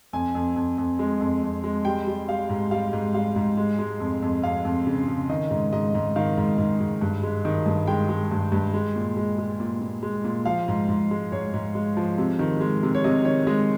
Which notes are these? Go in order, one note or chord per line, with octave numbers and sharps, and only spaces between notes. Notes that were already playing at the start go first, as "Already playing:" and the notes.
F2 G#5
F2
F2
F2
G#3
F2
F2
G#3
G3 G5
G3
G3 F5
G#2
G3 F5
G#2
G3 F5
G#2
G#3
G#3
F2
F2
F2 F5
F2
C#3
C#3
D#3 D#5
G#2
G#2 D#5
G#2
D#3 F5
G#2
G#2
G#2
G2
G#3
D#3
G2
G#3 G5
G#3
G2
G2
G#3
A#2
G#3
G#3
A#2
A#2
G#3
A#2
F3 F5
G#2
G#2
G#3
G#2 C#5
G#2
G#3
F3
C3
D#3
G#3
C3
C#5
C3 D#5
D#3 C#5
G#3 D#5